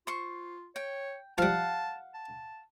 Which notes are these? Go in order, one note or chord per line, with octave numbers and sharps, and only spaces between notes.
F4 C5 C#6
C#5 G5
F3 G3 F5 F#5 A5
A5